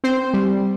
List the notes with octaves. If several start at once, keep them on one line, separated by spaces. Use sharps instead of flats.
C4 C5
G3